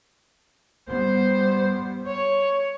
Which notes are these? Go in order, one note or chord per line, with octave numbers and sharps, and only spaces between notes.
G3 B3 C5
C#5